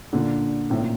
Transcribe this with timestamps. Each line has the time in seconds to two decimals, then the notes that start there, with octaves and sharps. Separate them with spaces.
0.13 A#2 D3
0.70 A2 C3
0.80 A#2